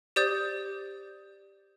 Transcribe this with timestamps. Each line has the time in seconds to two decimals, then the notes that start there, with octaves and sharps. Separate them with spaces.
0.16 G4 C5 D5 D#6 G6